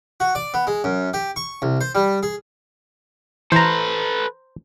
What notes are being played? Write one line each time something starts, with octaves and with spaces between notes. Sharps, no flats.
F#4
D5
B3
G#3
F#2
G4
C#6
C2
C5
G3
G#4
E3 A4 B4 C5 A#5